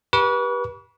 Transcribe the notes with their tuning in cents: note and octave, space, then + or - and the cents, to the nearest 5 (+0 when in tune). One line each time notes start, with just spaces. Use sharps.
G4 +0 B4 -30 C#6 +40